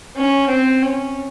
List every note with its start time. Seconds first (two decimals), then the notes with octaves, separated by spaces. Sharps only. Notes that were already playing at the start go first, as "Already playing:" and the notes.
0.16 C#4
0.49 C4
0.82 C#4